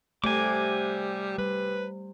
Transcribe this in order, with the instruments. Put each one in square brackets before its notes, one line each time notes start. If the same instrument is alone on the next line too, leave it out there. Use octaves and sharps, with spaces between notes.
[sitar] C3 [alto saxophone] G3 [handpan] A3 [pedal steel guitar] G#5 D6
[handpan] G3 [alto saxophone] B4